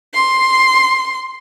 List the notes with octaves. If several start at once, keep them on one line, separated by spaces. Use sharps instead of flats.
C6